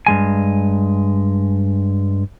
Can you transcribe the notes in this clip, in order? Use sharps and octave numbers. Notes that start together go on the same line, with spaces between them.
G2 G#3 G#5